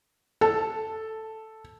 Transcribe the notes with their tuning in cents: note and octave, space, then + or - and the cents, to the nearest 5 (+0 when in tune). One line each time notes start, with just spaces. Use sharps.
A4 +0 A5 +0